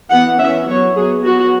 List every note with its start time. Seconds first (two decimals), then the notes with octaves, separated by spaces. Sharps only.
0.10 E3 B3 F#5
0.39 E3 C#4 E5
0.68 F#3 B3 C#5
0.95 F#3 B3 G#4
1.24 F#3 B3 F#4